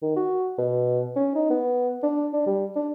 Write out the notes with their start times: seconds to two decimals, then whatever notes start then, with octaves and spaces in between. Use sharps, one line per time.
0.02 D#3
0.16 F#4
0.58 B2
1.16 C#4
1.35 D#4
1.50 B3
2.03 D4
2.34 D4
2.47 G3
2.76 D4